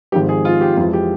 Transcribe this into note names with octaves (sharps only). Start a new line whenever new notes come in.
G#1 G#2 F3 G#3 G4
G#4
F4
G4
F2 E3 G#3 F4
G4